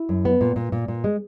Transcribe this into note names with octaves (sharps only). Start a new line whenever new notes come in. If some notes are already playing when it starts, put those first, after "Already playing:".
Already playing: E4
F#2
B3
A#2
A#2
A#2
A#2
G#3